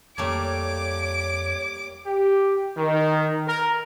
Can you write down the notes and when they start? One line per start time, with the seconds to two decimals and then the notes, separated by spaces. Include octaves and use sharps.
0.18 F2 G3 A3 A#3 C#5 D6
2.06 G4
2.77 D#3
3.47 A#4